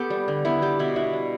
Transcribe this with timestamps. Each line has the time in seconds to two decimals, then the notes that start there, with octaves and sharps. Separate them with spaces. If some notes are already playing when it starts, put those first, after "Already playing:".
Already playing: B3 G4 A4
0.10 G3
0.28 D3
0.45 B3 E4
0.62 G3 G4
0.79 B2 E4
0.96 D4 E4
1.13 G3